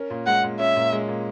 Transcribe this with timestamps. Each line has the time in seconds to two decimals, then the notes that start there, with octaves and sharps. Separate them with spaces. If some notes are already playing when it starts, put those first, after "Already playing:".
Already playing: C#4 A#4
0.10 A#2
0.26 G#3 F#5
0.44 A#2
0.59 C#4 E5
0.76 A#2
0.93 G#3
1.08 A#2